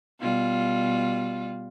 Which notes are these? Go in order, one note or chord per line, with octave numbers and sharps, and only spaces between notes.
B2 G3 F4